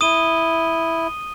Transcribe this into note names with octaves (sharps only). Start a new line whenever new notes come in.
E4 D#6 D#7 G7